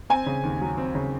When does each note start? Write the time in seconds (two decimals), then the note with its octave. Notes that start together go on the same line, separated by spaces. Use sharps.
0.10 C4 G#5
0.26 C#3
0.43 D#2
0.61 F#3
0.78 C4
0.95 C#3